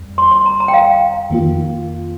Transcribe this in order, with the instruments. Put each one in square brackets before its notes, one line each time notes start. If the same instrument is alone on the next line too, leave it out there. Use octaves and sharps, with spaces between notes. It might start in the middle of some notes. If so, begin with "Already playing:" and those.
Already playing: [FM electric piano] F2 G3
[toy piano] C6
C6
A#5
A#5
G5
F5
[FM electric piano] F2 D#3 A#3 F4